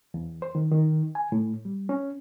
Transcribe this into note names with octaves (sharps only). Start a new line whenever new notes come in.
E2
C5
D#3
D#3
G#5
A2
G3
C#4